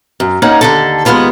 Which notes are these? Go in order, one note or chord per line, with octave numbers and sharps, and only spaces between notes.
F#2
A#3 C#4 D#4 F#5
D#2 D3 A4
D#2 G#3 B3 F4 B4